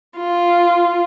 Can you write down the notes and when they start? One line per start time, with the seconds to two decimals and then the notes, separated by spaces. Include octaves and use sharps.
0.17 F4